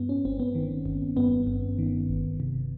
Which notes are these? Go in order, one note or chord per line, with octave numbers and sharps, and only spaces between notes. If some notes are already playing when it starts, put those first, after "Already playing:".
Already playing: G2 B3
C#4
G1 C4
B3
D#3
G1
G2 B3
G1
D#3
G1
C3